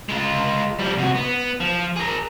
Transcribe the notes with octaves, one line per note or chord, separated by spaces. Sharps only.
G#3 F4
F3 G3
C3 F#4
B3
F3
G#4 A#4